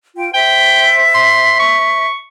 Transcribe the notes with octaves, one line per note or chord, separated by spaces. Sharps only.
F4 G5
C5 E5 G5
C6
C#6